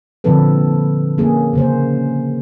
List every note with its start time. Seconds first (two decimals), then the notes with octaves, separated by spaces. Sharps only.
0.24 A#2 D3 F3 C4 A4 B4
1.18 A#3 C#4 G#4
1.53 C#3 A#3 C5